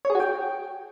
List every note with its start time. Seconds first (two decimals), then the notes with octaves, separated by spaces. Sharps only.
0.05 C#5
0.10 G#4
0.15 F#4
0.20 G5